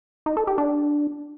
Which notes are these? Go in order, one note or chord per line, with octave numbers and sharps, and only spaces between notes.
D#4
A4
G4
D4